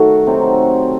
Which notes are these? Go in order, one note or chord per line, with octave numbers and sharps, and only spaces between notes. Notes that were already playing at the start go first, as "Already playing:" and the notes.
Already playing: D#3 F#3 A3 F#4 A4
C3 F#3 C4 D#4